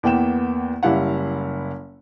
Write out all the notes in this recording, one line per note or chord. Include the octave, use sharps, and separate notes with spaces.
E2 A#3 B3 G5 E7
F#1 G3 E4 F5 F#5